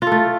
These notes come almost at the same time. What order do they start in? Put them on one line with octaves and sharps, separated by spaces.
F4 A4 A3